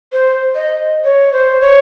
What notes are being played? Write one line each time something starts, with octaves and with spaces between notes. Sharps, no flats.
C5
D#5
C#5
C5
C#5